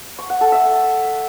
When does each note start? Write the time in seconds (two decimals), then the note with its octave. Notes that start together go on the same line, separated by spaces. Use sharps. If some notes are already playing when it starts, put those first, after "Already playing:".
0.19 C#6
0.30 F#5
0.41 A4
0.52 E5